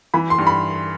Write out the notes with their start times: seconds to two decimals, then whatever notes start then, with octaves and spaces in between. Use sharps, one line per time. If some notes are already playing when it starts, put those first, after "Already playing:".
0.14 E3 B5
0.30 C6
0.38 G2
0.47 B5